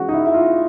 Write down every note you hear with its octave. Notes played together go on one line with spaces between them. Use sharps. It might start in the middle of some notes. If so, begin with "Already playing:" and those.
Already playing: E3 G#3 C#4 F#4
D#4
E4
E4
F4